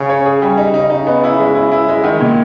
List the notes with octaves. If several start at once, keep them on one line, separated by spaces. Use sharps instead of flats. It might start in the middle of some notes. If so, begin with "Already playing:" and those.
Already playing: C#3
C#5
G#4
G3
D#4
C#3 D#4
D#4
B3
E4
G#3
E4
E4
G#3
D#3
A#2